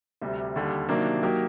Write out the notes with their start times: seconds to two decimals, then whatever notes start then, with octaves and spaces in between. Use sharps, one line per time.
0.22 D2 C3 G3
0.56 D#2 D3 G3
0.89 C3 D#3 F#3 A#3 D4
1.23 F#3 A#3 D#4 G4 A#4